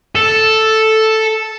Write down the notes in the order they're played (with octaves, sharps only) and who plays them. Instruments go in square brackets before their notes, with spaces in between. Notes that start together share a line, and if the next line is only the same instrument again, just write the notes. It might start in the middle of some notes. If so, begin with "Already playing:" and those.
[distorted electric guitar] A4